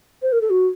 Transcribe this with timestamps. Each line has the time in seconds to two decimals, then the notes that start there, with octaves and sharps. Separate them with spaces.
0.22 C5
0.32 A#4
0.41 A4
0.50 F#4